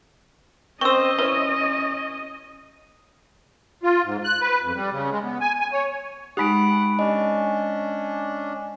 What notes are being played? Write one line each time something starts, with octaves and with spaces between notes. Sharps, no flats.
C4 C#4 C5 D#5 C#6 E6
E4 B4 C#5
F4
G#2
F#6
B4
F2
G3
C#3
G#3
B3
G#5
G#5
C#5
G#3 D#4 G4 F#5 B5 F#6 D7
C#4 D4 D#5